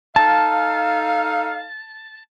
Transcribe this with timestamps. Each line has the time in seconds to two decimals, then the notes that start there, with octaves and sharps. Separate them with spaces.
0.16 D#4 A4 F5 A5